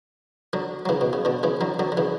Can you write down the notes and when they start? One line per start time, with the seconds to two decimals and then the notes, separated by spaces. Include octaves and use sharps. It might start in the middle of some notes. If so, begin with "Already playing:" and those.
0.53 D3 F#3
0.86 F#3
0.89 C#3 E3
1.01 B2
1.13 C#3
1.25 B2 D3
1.43 C#3 E3
1.61 D3 F#3
1.79 D3 F#3
1.92 D3
1.97 C#3 E3